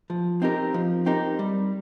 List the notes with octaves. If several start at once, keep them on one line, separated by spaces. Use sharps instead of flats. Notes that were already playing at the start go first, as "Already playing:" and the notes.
F3
C4 D#4 G4 A#4
F3
C4 D#4 G4 A#4
G3